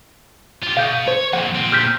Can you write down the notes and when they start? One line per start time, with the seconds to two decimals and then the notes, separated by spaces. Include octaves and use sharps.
0.63 F4 G4
0.77 B2 F5 G6
1.08 C5 C#5
1.33 F2 A#2 F#5
1.55 A#2 C4
1.72 F6 G6 B6